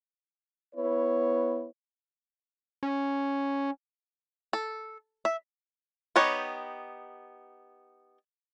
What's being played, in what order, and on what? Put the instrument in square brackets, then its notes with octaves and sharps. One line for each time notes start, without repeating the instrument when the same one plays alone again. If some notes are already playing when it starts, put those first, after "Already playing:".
[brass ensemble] B3 E4 B4 C#5
[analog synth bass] C#4
[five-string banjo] A4
E5
B3 D#4 G4 C#5